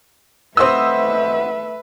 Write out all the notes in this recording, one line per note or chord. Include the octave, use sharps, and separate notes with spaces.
A3 C4 F#4 B4 C5 D#5 E5 E6